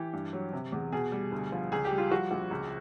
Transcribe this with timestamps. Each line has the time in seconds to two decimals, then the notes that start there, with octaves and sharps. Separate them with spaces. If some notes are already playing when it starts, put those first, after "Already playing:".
Already playing: E3 G4
0.13 G2
0.33 F#3
0.53 C3
0.72 E2
0.92 B2 G#4
1.12 G3
1.32 D2
1.52 F3
1.72 C#2 G#4
1.85 G4
1.91 G3
1.98 F4
2.11 F3 F#4
2.31 A#1
2.51 C#2